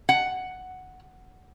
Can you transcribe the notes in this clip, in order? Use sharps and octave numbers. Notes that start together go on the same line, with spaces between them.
F#5